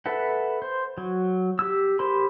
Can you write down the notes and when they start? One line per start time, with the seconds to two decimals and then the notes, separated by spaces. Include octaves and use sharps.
0.06 A4 B4 E5 F#5
0.62 C5
0.98 F#3
1.59 G4 E6
1.99 G4 A#4 C5 B5 C6